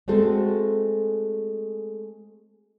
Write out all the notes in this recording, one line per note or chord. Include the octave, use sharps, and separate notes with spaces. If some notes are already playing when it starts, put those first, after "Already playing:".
G#3 A3 C4 F#4 A4